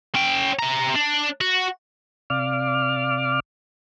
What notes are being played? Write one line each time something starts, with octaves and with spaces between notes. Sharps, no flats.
C#4 G5
C3 A#5
D4
F#4
C3 D5 F5 D6 F6